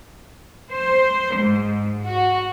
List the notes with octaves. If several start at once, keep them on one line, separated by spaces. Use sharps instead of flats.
C5
G#2
F#4